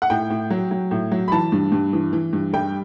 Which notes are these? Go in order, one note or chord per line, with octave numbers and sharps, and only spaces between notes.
F#5
A2 G5
A2
F#3
F#3
A2
F#3
B5
E3 A5
G2
G2
E3
E3
G2
G3 G5